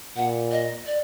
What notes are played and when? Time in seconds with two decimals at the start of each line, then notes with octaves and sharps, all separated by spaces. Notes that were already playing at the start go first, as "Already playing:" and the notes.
0.16 A#2 F#5
0.52 D#5
0.87 D5